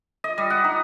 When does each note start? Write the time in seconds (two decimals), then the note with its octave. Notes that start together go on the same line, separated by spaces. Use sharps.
0.24 D#5
0.38 G3
0.50 F#5
0.64 D#4